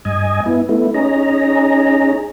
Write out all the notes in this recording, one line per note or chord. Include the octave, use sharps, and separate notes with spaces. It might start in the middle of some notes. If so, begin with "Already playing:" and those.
G2 D#5 G#5
B3 E4
A3 B3 E4
C#4 D#4 G#4 A#5